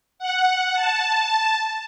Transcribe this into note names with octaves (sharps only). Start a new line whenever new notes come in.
F#5
A5